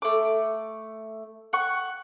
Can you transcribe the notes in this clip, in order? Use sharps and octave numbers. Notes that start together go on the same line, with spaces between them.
A3 D6
F#5 C#6